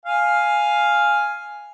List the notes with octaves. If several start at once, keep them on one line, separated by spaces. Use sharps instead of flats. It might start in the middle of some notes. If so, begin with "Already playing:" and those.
F5 G#5